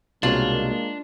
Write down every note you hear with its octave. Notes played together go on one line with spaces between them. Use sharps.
C2 B2 G#3 A#3 D4 F4 C#5